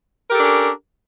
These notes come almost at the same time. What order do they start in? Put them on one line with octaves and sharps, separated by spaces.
A#4 G4 A4 D4 C#4